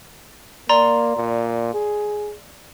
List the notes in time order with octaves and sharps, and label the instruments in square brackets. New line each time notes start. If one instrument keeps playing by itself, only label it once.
[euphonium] A#3 [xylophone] D5 A#5 C6
[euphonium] A#2
G#4